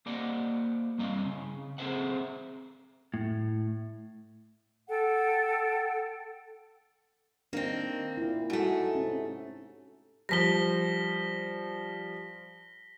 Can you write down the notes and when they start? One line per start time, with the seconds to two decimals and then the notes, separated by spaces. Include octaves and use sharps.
0.06 A#3 G4 C5 D5 D#5 F#5
0.98 G2 G3 C4 D#5 F5
1.25 C#3
1.78 C4 G#4 A4 C5 E5 F#5
3.14 A2
4.89 A4 F#5 G5
7.53 D#3 A#3 C4 D4
8.17 A#2 E4
8.50 G#2 A3 F#4
8.95 C3 C#4
10.29 F3 G3 A#6 B6 G7